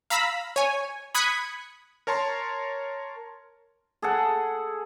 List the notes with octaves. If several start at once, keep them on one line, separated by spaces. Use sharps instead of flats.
F5 A#5 B5 E6 B6
C#5 G#5
B5 D#6 F#6 G#6 B6 C#7
A#4 C#5 A5 A#5 C6
G#4 A4 F#5